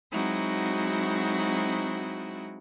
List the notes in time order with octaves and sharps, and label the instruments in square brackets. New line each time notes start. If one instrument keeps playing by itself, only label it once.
[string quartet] F#3 G#3 C4 D#4 E4 F#4